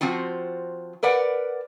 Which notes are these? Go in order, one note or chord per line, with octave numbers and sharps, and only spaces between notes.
F3 C4 F4 F#4
A#4 B4 D5 F#5